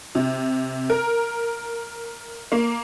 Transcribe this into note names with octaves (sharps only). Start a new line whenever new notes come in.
C3
A#4
A#3